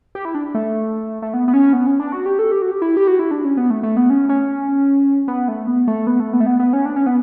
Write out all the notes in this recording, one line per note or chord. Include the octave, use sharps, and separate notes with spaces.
G4
E4
D4
A3
A3
B3
B3
C#4
B3
C#4
D4
F#4
G4
A4
G4
F#4
G4
E4
G4
F#4
E4
D4
C#4
B3
A3
A3
B3
C#4
C#4
B3
A3
B3
A3
B3
A3
B3
A3
B3
B3
C#4
D4
C#4
B3